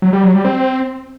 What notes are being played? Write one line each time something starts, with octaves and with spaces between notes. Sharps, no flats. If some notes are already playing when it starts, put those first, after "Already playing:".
F#3
G3
F#3
G3
C4